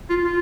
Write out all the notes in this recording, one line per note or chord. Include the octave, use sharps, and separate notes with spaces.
F4
F4